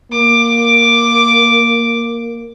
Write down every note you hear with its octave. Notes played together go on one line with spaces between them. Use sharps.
A#3 D6